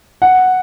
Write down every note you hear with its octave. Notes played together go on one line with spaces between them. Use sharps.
F#5